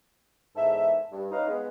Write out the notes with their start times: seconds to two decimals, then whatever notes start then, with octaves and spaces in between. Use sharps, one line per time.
0.56 E2 G#2 A4 E5
1.12 G2
1.32 C#4 D#4 B4 D#5 F5
1.48 G#3 B3